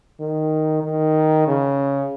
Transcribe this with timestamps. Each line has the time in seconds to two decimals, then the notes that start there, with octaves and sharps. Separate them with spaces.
0.20 D#3
0.83 D#3
1.47 C#3